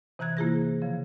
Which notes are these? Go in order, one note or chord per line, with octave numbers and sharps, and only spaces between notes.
C3 E3 A#5 F#6 G#6
A#3 E4 F4 G#4 C5 A#6
C#3 F3